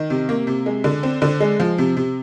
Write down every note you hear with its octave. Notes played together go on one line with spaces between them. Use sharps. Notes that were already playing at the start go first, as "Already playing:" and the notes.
Already playing: D#3
C3
A#3
C3
G#3
D3
C4
D3
G#3
F3
C3
C3